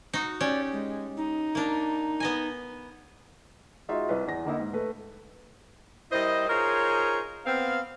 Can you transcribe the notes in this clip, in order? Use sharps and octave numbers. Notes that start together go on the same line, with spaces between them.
D#4 F#4
C#4 G4 D5
G#3
D#4
A#3 D4
B3 D#5 G#5
G#3 D#4 F4 F#4 E5
C2 B4
E2 A#6
D3 A#3 D#4 E4
G#2
A3 B4
G3 E4 A#4 C5 D#5
D#4 F4 G#4 A#4 C5 C#5
B3 C4 F5